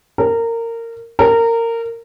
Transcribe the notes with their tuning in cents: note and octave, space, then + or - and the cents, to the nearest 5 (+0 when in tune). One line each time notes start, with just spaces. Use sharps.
A#4 -20
A#4 -20